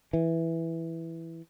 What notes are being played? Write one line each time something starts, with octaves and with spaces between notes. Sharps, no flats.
E3